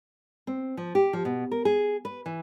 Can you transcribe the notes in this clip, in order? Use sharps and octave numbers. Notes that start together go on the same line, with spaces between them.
C4
F3
G4
F3
B2
A#4
G#4
B4
E3